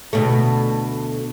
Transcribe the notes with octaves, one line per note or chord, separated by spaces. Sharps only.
D2 B2 A3